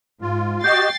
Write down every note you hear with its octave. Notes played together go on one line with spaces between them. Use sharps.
G#2 F4
F#4 G4 D#5 G5 G6 A6 C7